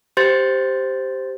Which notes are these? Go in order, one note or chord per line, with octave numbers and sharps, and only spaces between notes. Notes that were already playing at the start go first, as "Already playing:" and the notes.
G4 C5 C6 G6 A6